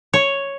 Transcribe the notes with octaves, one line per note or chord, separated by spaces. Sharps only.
C#5